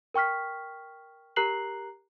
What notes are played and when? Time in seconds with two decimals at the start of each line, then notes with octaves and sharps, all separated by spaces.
0.14 A#4 G5 C#6 F6 B6
1.36 G4 A#4 A#5 F#6 C7 F#7